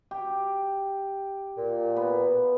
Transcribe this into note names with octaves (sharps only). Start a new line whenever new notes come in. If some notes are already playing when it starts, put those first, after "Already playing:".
G4
A#2
B3